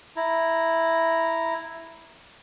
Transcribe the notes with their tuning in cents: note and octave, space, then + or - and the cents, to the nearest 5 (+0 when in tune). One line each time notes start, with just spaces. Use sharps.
E4 +0 A#5 +0